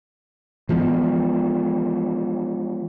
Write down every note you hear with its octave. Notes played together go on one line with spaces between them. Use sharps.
E3 F3 G#3 B3